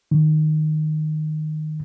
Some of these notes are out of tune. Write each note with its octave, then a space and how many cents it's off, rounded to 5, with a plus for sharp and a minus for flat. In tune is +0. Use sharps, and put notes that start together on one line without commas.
D#3 -10